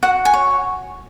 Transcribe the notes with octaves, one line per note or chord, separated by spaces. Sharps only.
F#4 F#5
G#5
C#5